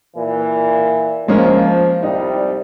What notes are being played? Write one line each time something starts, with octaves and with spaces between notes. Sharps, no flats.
A#2 E3
F3 G#3 A#3 C#4
C2 G3 D#4